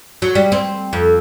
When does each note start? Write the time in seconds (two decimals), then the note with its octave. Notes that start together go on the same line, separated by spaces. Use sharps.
0.22 F#3
0.35 G3
0.52 C4
0.93 F2